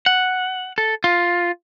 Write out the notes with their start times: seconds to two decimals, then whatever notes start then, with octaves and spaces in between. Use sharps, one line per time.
0.06 F#5
0.78 A4
1.04 F4